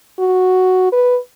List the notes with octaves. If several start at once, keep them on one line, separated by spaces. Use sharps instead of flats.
F#4
B4